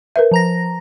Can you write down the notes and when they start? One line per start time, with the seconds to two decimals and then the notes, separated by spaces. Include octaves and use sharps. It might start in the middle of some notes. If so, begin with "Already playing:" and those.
0.16 A#4 B4 E5
0.31 F3 A#5 A#6